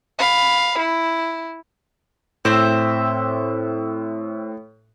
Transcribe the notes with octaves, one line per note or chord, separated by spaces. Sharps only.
F5 B5
E4
A2 C4 C5 E5